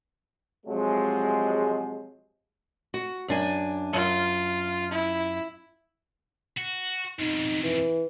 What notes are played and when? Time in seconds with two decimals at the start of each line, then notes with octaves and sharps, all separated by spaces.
0.66 C3 F3 F#3 G#3
2.94 F#4
3.28 F#2 D4 G#5
3.93 F#2 F4
4.91 E4
6.57 F#4
7.19 F2 B2 D#4
7.63 E3